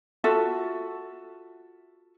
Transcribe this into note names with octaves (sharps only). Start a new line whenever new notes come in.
F4 F#4 A4 E5